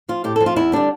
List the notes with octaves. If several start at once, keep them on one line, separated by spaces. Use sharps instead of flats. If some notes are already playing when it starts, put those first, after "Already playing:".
F3 F4
A2 G4
A4
F3
F4
E2 E4
D3 G3 D4